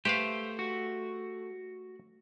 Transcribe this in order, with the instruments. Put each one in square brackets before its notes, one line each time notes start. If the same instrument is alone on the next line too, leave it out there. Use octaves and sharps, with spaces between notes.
[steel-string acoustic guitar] A3 [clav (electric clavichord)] G4 B4 F5 [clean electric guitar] C5
[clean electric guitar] F#4